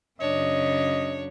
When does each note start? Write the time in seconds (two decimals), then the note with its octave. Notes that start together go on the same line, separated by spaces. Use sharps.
0.20 F#2 C#3 D4 C#5 D#5